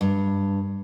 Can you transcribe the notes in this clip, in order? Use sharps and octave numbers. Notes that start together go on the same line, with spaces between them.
G2